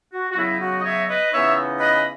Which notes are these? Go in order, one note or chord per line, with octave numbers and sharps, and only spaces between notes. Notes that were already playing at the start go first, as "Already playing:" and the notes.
F#4
F#4
C#3 F#3 B3 D#4 E4
F#4
D#5
C#5 E5
B4 D#5
C#3 E3 B3 D#4 C#5 E5
B4 D#5